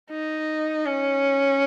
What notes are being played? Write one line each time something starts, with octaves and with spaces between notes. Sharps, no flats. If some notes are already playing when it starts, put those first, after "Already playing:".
D#4
C#4